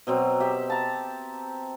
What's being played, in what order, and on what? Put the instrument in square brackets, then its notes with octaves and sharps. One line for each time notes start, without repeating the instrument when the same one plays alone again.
[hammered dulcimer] B2 F#3 C4
G4 E5
A5 A#5